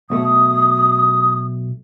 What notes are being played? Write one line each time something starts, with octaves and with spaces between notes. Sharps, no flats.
B1 B2 A3 D#6